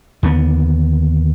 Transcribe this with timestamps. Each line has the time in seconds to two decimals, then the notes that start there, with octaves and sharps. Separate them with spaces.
0.23 D#2 D3 A#3 B3